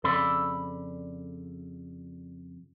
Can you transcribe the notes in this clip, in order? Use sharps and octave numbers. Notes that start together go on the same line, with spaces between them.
F2 C#3 A4 D5 B5